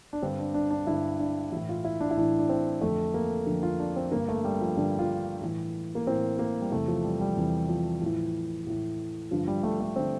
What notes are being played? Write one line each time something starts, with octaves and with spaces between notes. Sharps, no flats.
D4
G2 D3 C4
D4
D4
D4
G2 D3 E4
D4
A2 E3 E4
F4
E4
D4
E4
A2 E3 D4
D4
C4
F2 D3 A3
A#3
F2 D3
F4
D4
C4
G2 D3 A#3
A3
G3
F3
G2 D3 G3
F4
A2 E3
A#3
A2 E3 C4
A#3
G3
E2 C3 E3 A3
F3
G3
G3
E2 C3 E3
F3
A2 E3
A2 E3
G2 D3 F3
G3
A3
A3
D3 C4